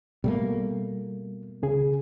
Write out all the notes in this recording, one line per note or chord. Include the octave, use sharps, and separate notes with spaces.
B2 G3 A3 A#3
C#2 C#3 G#4